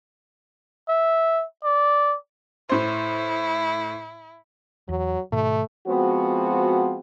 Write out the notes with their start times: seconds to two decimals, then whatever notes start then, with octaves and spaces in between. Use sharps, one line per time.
0.89 E5
1.64 D5
2.69 A2 E4 C5
4.89 E2 F#3
5.32 G#2 B2 D#3 A3
5.87 F3 G#3 B3 C4 F#4